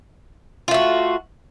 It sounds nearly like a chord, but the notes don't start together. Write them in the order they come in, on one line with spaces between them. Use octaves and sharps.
F4 A3 F#4